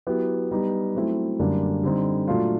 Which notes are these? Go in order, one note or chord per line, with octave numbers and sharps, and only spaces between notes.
F#3 B3 E4 G4
G3 B3 D#4 G4
F#3 A3 C4 E4
F#2 D3 G3 A#3 D4
D3 G3 C4 D#4
A#2 F#3 A3 D4 F4